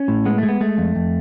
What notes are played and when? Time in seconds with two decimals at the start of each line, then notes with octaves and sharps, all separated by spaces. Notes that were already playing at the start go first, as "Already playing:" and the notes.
Already playing: C#4
0.08 A2
0.25 G#3 B3
0.38 G#3 A3
0.48 B3
0.61 G#3 A3
0.78 F2
0.96 F2